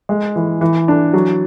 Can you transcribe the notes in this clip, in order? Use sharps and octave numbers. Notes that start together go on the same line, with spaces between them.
G#3
E3
E3
D4
F#3